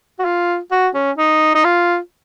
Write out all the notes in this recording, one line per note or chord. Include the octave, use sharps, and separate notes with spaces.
F#4
F4
F#4
C#4
D#4
D#4
F4